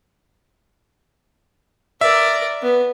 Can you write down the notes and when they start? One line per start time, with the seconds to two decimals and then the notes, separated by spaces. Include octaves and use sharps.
2.01 A#4 D5 E5
2.62 B3